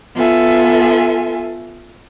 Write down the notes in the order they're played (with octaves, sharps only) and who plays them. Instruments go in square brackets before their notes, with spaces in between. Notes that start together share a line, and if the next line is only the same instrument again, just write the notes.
[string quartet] B3 F4 A4 E5 G#5